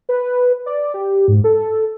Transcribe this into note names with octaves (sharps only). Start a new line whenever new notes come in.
B4
D5
G4
G#2
A4